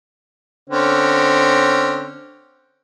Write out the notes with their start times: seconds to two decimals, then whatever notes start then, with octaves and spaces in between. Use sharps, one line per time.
0.70 D3 C4 C#4